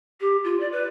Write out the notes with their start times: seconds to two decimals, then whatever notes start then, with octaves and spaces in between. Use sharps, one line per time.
0.21 G4
0.44 F4
0.60 D5
0.72 B4